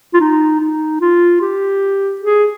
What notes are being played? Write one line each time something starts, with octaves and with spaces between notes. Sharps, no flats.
F4
D#4
D#4
F4
G4
G#4